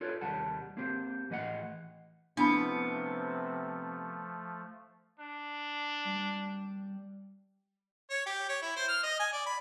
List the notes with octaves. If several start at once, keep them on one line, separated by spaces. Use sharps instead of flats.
F4 A4 B4 C#5 D5
D#2 C3 G3 F#5 A5
A#3 C4 G4 C5
A2 E3 D#5 E5 F#5
C3 F3 A3 B3 D4 E4 B5
D4
G3
C#5
G4
C#5
E4
C5
F6
D#5
G#5
D5
B5